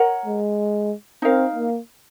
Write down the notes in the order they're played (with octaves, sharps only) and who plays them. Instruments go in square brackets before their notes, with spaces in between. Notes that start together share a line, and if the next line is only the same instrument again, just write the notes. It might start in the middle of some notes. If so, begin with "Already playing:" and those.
Already playing: [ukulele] A#4 C#5 F#5 A#5
[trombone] G#3
[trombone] C4 [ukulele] D#4 A#4 F5
[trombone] A#3